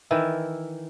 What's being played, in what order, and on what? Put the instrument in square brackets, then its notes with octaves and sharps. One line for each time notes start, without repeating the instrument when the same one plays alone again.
[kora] D#3 E3 E4